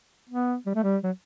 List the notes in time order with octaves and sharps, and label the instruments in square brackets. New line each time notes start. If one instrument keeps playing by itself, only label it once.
[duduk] B3
G3
A3
G3
F#3